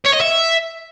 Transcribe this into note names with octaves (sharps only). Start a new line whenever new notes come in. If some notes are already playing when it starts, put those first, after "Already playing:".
C#5
D#5
E5